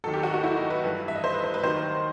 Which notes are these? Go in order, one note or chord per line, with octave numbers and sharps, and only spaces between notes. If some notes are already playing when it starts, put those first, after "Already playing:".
D#2 D#3 F#3 A4
G4
F#4
F#4
E4
D#4
B4
G2 E3
E5
D#5
C5
B4
C5
B4
D#2 D#3 F#3 C5